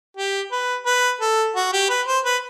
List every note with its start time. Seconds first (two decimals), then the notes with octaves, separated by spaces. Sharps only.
0.17 G4
0.52 B4
0.86 B4
1.21 A4
1.56 F#4
1.73 G4
1.90 B4
2.07 C5
2.25 B4